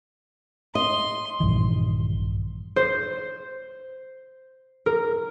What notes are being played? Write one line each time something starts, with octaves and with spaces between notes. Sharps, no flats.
D#5 C6
A#1 G2 D#3 E3
C5
A#4